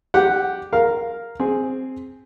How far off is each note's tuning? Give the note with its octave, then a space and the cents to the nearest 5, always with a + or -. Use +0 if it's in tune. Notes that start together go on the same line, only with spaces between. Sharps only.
G4 +0 F#5 +0
A#4 +0 F5 +0
C4 +0 G#4 +0